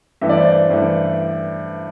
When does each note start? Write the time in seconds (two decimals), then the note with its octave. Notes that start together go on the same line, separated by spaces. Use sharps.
0.21 G2 E3 A3 E5
0.29 D5
0.37 C5
0.45 D5
0.70 G2 E3 A3